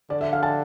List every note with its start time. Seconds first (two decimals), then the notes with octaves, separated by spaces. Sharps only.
0.10 D3 D5
0.21 E5
0.33 F5
0.43 A5